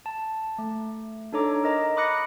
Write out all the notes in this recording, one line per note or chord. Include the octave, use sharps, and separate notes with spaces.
A5
A3
D4 D#4 A4 C#5 A#5 D6
A#4 D#5 A#5
B5 D6 D#6 F#6 A#6 C#7